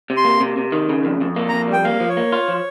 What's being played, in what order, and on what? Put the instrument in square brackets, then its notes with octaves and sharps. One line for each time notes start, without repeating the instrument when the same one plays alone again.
[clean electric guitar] C3
[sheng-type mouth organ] C6
[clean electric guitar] A#3
C3
C3
D#3
C#3
F2
F2
A#3
[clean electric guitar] F2 [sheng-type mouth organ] A#5
[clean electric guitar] G3 [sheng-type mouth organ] G5
[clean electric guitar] A#3 [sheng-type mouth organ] F5
[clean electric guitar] F3
[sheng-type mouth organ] C#5
[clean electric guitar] A#3
F4
F3